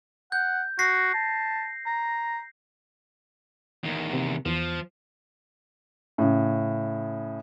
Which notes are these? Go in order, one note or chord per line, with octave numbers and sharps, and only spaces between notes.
F#5 G6
F#4 A#6 C7
A5
A#5
E2 D#3
C3
E2 F3
A2 C#3